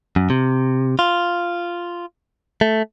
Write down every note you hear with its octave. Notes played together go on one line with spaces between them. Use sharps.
F#2
C3
F4
A3